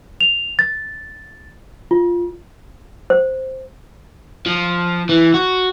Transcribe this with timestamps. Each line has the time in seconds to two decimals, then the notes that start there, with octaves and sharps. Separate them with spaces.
0.21 F7
0.59 A6
1.91 F4
3.10 C5
4.46 F3
5.09 E3
5.34 F#4